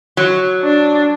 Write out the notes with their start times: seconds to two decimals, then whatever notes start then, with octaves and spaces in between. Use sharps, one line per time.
0.17 F#3
0.63 D4